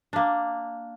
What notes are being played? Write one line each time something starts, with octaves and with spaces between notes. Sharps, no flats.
A#3 D4